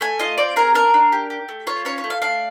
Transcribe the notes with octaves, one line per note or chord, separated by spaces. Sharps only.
A3 G#5
F4 D#5
C4 D5
G#4 A#4
D4 A#4
D4
G4
G4
A3
F4 C#5
C#4 C#5
C#5
A3
F5
D4 F5